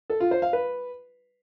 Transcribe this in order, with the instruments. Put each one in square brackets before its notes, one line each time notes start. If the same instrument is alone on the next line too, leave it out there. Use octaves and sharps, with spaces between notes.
[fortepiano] A4
F4
C5
F5
B4